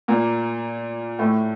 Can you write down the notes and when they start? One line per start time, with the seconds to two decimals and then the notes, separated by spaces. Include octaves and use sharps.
0.08 A#2 A#3
1.19 A2 A3